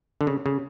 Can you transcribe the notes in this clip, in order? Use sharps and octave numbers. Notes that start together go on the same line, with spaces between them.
D3
C#3
C#3